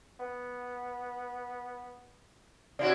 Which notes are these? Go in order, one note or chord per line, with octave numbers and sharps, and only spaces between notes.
B3
C3 E4 F#4 D5